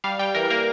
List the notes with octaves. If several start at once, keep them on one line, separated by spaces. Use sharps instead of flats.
G3 F5
G3 G5
E3 A#4
A#3 A#4